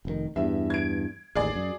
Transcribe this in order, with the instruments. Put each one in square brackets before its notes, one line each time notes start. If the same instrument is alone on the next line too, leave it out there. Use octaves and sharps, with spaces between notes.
[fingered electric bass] F1 B2 D#3
[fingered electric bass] E2 G2 [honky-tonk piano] E5
[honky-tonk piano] G#6 D7
[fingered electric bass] A1 D#2 [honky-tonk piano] G#4 D5
[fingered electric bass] F#2